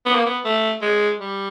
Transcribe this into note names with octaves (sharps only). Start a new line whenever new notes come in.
B3
A#3
B3
A3
G#3
G3